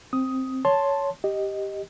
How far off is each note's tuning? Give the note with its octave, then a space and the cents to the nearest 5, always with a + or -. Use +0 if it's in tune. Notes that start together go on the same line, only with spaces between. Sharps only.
C4 +5 D#6 +10
C#5 +10 A5 +0 C6 +5
G4 +0 D#5 +0